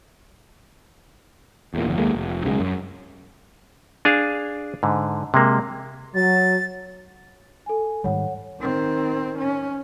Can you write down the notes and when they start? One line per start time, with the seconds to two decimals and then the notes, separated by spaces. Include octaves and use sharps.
1.74 E2 A#2
1.86 F#1 E2
1.98 D#2 G#3 A#3
2.15 F1
2.44 B1 C#3 F#3 G#3
2.60 F#2
4.05 D4 G#4 F5
4.83 G#2 D3
5.34 C3 G#3 A#3
6.15 F#3 A6
7.66 A4 G#5
8.04 G#2 D#3 G3 C#5 F#5
8.60 D#3 C4
9.38 C#4